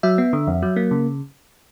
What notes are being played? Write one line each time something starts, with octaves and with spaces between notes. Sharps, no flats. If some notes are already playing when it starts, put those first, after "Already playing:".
F#3 E5
B3
D3
F2
F#3
A#3
C#3